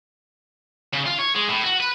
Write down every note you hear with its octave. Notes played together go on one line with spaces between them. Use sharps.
C#3
F4
C#5
G#3
A2
F#4
B4